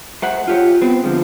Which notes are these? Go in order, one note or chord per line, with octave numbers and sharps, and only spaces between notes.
A3 C5 F#5
F4 G4 C#5
B3 C4
D3 F3 G#3